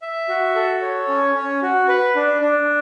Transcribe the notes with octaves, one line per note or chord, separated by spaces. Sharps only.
E5
F#4
A4
C#5
C#4
C#4
F#4
B4
D4
D4